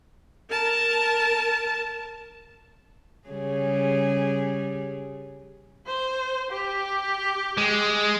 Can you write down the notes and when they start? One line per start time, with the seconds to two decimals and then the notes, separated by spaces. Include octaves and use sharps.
0.50 A#4 A5
3.29 C#3 G3 G#4
5.86 C5
6.51 G4
7.58 G#3